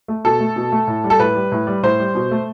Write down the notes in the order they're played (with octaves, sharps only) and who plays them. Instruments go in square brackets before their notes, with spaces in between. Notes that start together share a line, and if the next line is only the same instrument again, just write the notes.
[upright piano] A3
B2 A4
A3
B2
A3
A2
G3
A4
A2 B4
G3
A2
G3
A2 C5
G3
B2
A3